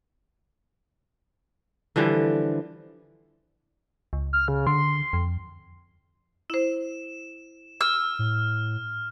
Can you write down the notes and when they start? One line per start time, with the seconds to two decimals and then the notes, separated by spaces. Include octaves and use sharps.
1.96 D3 E3 F3 G3
4.13 C#2
4.33 F6
4.48 C#3
4.67 D3 C6
5.13 F2
6.50 E4 C5 E7
7.81 E6 F6
8.19 A2